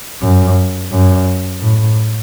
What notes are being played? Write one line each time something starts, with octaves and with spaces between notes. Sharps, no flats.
F#2
F#2
A2